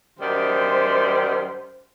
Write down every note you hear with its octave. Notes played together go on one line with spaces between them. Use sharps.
F#2 D#3 G3 C5